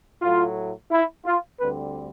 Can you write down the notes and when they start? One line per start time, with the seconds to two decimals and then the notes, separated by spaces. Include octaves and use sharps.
0.22 A2 F#3 A3 F4
0.91 E4
1.26 F4
1.60 D2 D3 G3 C4 B4